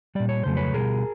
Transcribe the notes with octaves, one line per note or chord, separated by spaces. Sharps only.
A#2 G3 D5
C#5
F2 C#3 F#3 A3 C5
B4 C#5
B2 G3 G#4 A#4